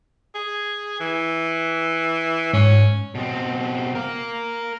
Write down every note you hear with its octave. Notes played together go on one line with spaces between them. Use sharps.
G#4
E3
G#2 C#4
B2 C4
A#4 F5